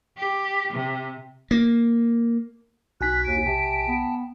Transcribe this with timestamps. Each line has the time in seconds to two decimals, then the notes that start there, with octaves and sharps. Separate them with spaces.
0.17 G4
0.73 C3
1.51 A#3
3.01 B1 D#4 F#4 G#5 F#6 B6
3.24 D#2 D7
3.46 C3 G5 A5
3.88 B3